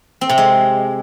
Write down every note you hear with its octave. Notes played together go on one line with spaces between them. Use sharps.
C4
C3
G#3